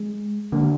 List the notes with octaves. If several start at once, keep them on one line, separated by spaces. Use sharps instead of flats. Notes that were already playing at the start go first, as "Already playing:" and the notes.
Already playing: G#3
D3 A#3